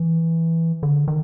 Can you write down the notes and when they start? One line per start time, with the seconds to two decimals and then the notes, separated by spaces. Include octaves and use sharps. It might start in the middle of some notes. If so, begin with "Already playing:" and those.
Already playing: E3
0.83 D3
1.08 D#3